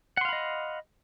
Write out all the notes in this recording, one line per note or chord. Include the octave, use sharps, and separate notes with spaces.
D#5 F5 F#5 B5 C6